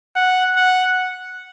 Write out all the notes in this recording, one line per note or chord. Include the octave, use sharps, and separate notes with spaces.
F#5
F#5